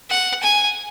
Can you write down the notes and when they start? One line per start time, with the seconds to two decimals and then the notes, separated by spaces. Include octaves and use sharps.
0.10 F#5
0.42 G#5